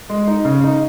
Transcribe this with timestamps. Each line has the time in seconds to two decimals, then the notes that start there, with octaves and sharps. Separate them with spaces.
0.09 G#3
0.27 D#4
0.45 C#3
0.64 D#4